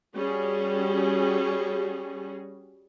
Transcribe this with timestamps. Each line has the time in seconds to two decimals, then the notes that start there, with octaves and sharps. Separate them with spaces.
0.15 G3 C#4 F#4 G#4